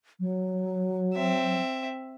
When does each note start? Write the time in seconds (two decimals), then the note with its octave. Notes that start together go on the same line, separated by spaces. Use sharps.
0.20 F#3
1.14 C4 E5